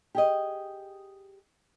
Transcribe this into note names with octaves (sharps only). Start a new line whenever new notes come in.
G4 G#4 D#5